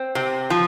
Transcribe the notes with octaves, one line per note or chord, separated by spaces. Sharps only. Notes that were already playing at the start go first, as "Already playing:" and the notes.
Already playing: C4
C3
F3